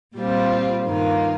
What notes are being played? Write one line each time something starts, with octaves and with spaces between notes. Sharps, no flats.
A#2 G3 C4 F4
G2 D#3 A#3 F4